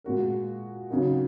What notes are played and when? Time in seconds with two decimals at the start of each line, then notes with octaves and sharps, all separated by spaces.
0.04 A#2 G#3 F#4 A#4
0.89 C#3 F#3 D#4 F#4 A#4